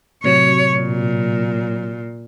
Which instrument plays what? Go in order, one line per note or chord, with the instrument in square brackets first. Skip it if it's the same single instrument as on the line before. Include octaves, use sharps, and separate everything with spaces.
[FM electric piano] A2 C3 F#3 [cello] C#5
[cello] A#2